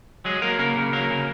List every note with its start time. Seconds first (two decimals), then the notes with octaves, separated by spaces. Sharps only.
0.25 F#3 G#3 G#4
0.42 F#3 A#3 A#4
0.59 C#3 A#3 A#4
0.76 C#3
0.93 F#3 A#3 A#4
1.10 C#3